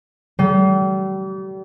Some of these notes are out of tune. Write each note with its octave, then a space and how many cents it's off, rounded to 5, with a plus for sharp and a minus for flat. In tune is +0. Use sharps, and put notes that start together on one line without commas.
G3 -40